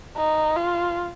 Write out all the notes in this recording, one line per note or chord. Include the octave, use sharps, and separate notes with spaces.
D#4
F4